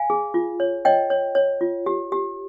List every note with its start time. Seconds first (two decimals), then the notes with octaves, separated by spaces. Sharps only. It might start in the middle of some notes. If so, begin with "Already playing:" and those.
Already playing: F5 G#5
0.10 G#4
0.34 F4
0.60 C#5
0.85 C#5 D#5 G5
1.10 C#5
1.35 C#5
1.61 F4
1.86 G4
2.12 G4